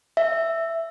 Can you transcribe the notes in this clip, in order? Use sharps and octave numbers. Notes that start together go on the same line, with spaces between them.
E5